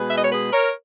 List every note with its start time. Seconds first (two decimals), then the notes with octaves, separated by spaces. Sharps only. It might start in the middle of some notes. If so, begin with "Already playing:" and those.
Already playing: B2 G#3 G#4 B4
0.09 E5
0.17 D#5
0.24 C#5
0.32 G#4 B4
0.52 A#4 C#5